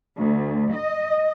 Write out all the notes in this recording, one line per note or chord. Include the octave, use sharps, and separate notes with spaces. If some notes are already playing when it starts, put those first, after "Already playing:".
D2
D#5